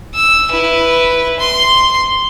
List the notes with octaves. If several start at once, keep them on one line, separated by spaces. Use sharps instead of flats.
E6
E4 B4
C6